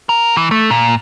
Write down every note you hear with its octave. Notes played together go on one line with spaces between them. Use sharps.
A#4
E3
A3
A#2